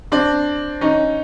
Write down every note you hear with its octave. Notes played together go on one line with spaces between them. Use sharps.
C4 D4
C#4 D#4